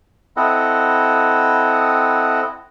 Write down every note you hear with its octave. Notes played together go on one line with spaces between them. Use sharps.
C4 E4 A4 D#5 F#5